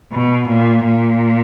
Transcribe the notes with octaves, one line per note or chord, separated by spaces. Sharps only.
B2
A#2
A#2